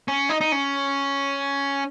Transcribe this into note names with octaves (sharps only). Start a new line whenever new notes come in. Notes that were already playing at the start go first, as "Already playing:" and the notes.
C#4
D#4
D#4
C#4